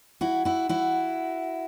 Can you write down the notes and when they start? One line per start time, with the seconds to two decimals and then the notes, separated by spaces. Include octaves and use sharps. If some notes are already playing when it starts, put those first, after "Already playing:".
0.21 E4 F#4
0.45 E4 F#4
0.69 E4 F#4